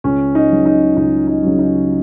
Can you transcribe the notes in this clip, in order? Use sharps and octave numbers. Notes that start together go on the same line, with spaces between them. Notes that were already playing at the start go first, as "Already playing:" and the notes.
C#2 C#4
D#4
C#3 F#3
D#4
C#2 D#4
D#4
C#3 F#3
D#4